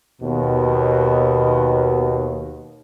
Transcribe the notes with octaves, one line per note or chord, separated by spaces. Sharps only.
D#2 B2